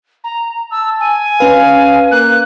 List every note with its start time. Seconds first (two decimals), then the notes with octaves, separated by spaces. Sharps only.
0.24 A#5
0.71 A5 E6
1.00 G#5
1.40 C#4 B4 F5
2.11 A#3 F#6